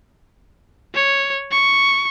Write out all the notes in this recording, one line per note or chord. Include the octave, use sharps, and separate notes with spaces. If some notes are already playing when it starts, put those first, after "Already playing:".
C#5
C#6